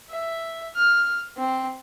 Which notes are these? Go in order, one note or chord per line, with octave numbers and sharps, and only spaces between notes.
E5
F6
C4